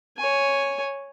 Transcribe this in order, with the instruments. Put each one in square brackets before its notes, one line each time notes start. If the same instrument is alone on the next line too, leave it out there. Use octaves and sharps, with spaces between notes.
[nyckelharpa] C#5 G#5